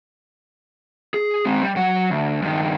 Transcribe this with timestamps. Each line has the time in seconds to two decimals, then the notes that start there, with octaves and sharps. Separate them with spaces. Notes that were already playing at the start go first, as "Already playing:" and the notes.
1.14 G#4
1.46 G#3 C4
1.63 G3
1.76 F#3 F#5
2.11 D2
2.42 G2 D#3